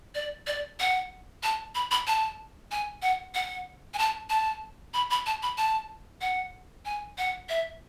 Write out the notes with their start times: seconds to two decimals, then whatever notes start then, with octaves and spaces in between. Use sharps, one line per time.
0.15 D5
0.47 D5
0.80 F#5
1.43 A5
1.75 B5
1.91 B5
2.07 A5
2.71 G#5
3.02 F#5
3.35 F#5
3.94 G#5
3.98 A5
4.30 A5
4.94 B5
5.10 B5
5.26 A5
5.43 B5
5.58 A5
6.21 F#5
6.85 G#5
7.18 F#5
7.49 E5